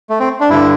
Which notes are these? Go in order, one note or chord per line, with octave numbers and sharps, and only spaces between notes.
A3
C4
D4
G2 D3 E4